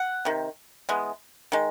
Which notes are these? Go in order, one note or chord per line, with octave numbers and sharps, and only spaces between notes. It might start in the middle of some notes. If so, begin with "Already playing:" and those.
Already playing: F#5
C3 D#3
E3 G#3 B3
D#3 G#3